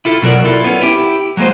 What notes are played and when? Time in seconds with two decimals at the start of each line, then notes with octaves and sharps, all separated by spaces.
0.05 E4 F4 A4
0.22 B2 F#3 A#4 D5
0.44 E4 F4 A4
0.64 B3 C#4
0.81 E4 G4
1.37 F#3 G#3 A#3 F4 C5